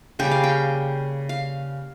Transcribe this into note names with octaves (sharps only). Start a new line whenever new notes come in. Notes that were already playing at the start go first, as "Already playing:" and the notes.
C#3 G3 A#3 G5
F5
G5
F5